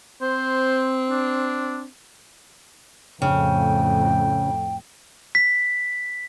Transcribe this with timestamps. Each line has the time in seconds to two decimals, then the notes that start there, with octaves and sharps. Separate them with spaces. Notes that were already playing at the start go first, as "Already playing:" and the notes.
0.21 C4 C5
1.10 D4
3.22 F2 A2 C#3 G5
5.35 B6